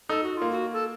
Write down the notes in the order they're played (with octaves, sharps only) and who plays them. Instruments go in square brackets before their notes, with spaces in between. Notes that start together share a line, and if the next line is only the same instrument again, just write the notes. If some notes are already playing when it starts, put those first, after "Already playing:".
[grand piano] D#4 [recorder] A4
[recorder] F#4
[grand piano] A#3 [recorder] F4
[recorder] F#4
A4